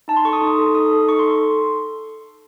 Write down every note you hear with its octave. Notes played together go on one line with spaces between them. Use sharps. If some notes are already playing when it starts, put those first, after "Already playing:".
D#4 A5
C6
A4 C#6
D#6
D#4
A4
D#4 D#6
A4
D#4 C#6
C6
A4